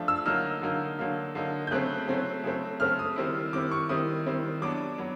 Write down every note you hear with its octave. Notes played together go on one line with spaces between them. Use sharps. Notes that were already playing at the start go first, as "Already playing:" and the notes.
Already playing: F3 A3 D4
E6
D3 F#3 A#3 D#4 F6
D3 F#3 A#3 D#4
D3 F#3 A#3 D#4
D3 F#3 A#3 D#4
G6
C#3 F#3 A3 C4 F#6
C#3 F#3 A3 C4
C#3 F#3 A3 C4
C#3 F#3 A3 C4 F6
D#6
D#3 G3 C4 E4
D#3 G3 C4 E4 D6
C#6
D#3 G3 C4 E4 D#6
D#3 G3 C4 E4
F#3 B3 D4 D6
F#3 B3